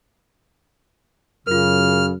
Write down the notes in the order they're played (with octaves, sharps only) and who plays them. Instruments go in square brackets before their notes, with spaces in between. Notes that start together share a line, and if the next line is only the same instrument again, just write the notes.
[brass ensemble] F#2 [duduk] C#3 [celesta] F4 A#4 [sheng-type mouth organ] F6